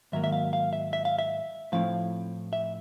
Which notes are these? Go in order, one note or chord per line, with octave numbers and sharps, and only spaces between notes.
G#2 D#3 F#3 A#3 E5
E5
F5
F5
E5
E5
F5
E5
A2 F3 A3 C4 E4 F5
E5